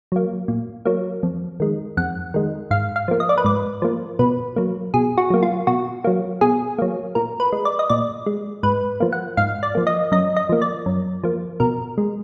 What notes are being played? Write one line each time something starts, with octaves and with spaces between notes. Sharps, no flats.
F#3 A#3
A#2
F#3 A#3
F2
D#3 G#3
F2 F#5
D#3 G#3
G#2 F5
F5
F3 A#3
D#5
D5
B4
G#2 D5
F3 A#3
B2 B4
F#3 A#3
B2 G#4
F#4
F#3 A#3
F4
B2 F#4
F#3 A#3
B2 G#4
F#3 A#3
A#2 A#4
B4
G#3
D5
D#5
A#2 D5
G#3
G#2 B4
F3 A#3
F#5
G#2 F5
D5
F3 A#3
D#5
F#2 D#5
D#5
F3 A#3
D5
F#2
F3 A#3
B2 A#4
G#3